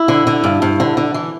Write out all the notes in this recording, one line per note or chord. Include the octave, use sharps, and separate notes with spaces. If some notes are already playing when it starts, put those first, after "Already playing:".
Already playing: E4
D3
D3
G2
G2
D3
D3
E3